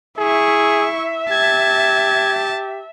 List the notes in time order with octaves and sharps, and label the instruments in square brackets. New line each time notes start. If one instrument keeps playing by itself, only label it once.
[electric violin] E4 C#6 [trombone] G#4 [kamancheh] E5
[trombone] G4 [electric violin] A5 [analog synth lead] G#6